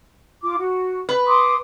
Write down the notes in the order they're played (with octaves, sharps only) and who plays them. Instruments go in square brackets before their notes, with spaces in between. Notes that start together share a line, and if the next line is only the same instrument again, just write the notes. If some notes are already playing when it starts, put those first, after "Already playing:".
[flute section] F4 D6
F#4
[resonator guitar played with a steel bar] B4
[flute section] C6 D6 D#6